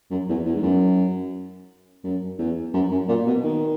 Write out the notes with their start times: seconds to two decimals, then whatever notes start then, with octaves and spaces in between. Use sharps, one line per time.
0.11 F#2
0.29 E2
0.45 E2
0.56 G#2
0.63 F#2
2.04 F#2
2.39 E2
2.74 F#2
2.92 F#2
3.09 A#2
3.27 B2
3.43 D#3